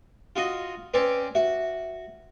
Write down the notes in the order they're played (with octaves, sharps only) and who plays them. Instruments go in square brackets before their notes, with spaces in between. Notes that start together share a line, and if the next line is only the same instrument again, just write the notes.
[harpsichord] F4 F#4 D#5
[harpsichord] C4 C#4 D5 [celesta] B4
[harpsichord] F#4 [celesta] E5